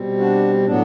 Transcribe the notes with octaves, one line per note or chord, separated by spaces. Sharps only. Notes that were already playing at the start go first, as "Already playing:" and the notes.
Already playing: B2 G3 C4
D4 F#4
A2 F#3 B3 D4